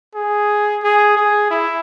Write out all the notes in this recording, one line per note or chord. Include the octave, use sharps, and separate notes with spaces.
G#4
G#4
G#4
E4